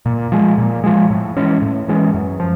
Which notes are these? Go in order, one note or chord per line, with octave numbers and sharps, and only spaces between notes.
A#2
F3 G#3
A#2
F3 G#3
A2
E3 G#3 C#4
A2
E3 G#3 C#4
F#2
F3